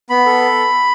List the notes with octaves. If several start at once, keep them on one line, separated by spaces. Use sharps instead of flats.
B3 B5
A4